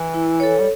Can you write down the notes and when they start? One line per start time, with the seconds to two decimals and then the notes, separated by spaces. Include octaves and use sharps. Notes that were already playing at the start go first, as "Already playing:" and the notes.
Already playing: E3
0.14 E4
0.40 A4 C#5
0.59 G3